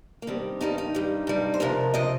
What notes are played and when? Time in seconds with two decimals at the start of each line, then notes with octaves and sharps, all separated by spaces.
0.22 A#3
0.27 G2 D#3 G3 C4
0.61 G2 D#3 G3 D#4
0.78 D#4
0.95 G2 G3
1.27 G2 G3
1.54 C5
1.60 F2 C3 F3 A#4
1.94 C3 F3 D#5